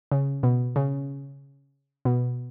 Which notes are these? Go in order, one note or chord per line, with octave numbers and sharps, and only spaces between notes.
C#3
B2
C#3
B2